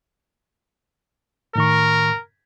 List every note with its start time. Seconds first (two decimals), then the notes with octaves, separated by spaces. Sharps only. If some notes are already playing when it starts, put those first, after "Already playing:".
1.56 A2 D#3 A#4 C#6